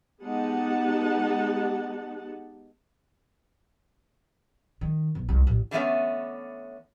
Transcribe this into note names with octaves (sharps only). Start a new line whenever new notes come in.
G#3 B3 D#4 G4 F#5 A5
D#3
B1
C2
A1
D3 E3 A3 B3 C#4